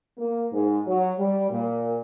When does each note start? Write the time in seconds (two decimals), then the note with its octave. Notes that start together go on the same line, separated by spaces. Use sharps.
0.18 A#3
0.52 G#2
0.87 F#3
1.18 G3
1.50 A#2